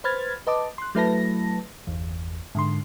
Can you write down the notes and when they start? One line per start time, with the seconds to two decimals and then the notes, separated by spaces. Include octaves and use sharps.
0.04 B4 C5 B5 F6 G#6 A6
0.47 B4 D#5 A5 D6
0.78 C6 F#6
0.95 F#3 A3 E4 B4 A5 A#6
1.87 G1 E2
2.55 G#2 D3 C6